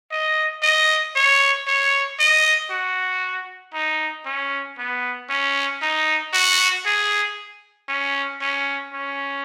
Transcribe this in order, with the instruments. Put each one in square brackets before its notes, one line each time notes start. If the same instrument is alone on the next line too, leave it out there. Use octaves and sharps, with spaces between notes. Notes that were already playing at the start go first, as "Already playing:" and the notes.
[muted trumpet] D#5
D#5
C#5
C#5
D#5
F#4
D#4
C#4
B3
C#4
D#4
F#4
G#4
C#4
C#4
C#4